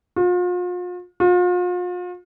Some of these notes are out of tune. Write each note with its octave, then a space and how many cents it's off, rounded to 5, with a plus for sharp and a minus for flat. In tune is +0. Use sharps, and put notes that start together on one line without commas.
F4 +40
F4 +40